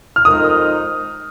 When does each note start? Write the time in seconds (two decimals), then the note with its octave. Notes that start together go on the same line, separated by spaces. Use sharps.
0.16 F6
0.25 F2 D#3 G#3 D#4 A#4 D#6